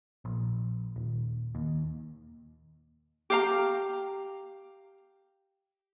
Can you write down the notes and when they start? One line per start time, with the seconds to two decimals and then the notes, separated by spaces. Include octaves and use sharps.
0.25 A#1
0.96 D#1
1.55 D#2
3.30 G4 F5 A#5